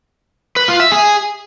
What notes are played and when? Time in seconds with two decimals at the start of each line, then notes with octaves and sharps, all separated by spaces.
0.56 B4
0.68 F4
0.80 E5
0.92 G#4